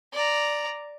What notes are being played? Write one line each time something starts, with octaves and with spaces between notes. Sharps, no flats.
D5 A#5